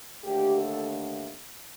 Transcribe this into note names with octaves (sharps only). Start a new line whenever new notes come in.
D#2 D3 A3 G4
A4